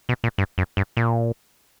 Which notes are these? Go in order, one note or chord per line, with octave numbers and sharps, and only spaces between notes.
B2
A#2
G2
F#2
G2
A#2